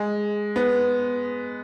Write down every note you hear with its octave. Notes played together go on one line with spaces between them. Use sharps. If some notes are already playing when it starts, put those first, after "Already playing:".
Already playing: G#3
B3